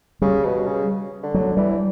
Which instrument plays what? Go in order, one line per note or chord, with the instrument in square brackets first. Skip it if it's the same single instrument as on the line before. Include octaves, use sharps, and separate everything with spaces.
[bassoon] C#3 [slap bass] G3
[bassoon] B2
C#3
D3
[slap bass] F#3
[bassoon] E3 [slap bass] G3